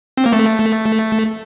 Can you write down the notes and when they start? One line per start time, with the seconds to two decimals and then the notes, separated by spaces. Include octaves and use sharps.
0.17 C4
0.26 A#3
0.33 A3